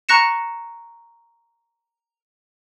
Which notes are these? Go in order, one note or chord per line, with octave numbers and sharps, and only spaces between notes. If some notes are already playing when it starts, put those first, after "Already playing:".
A#5 C#6 F#6 A#6 C#7 E7